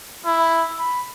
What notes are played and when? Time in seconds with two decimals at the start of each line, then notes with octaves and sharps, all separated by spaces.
0.25 E4
0.79 B5